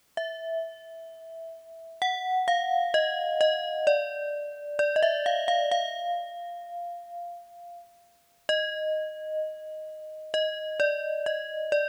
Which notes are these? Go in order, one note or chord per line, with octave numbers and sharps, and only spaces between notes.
E5
F#5
F5
D#5
D#5
D5
D5
D#5
E5
F5
F5
F5
D#5
D#5
D5
D#5
D5